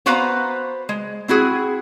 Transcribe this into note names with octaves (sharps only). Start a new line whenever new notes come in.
B3 F#4 B4 C5 F5 A#5
G#3
C4 E4 F#4 G#4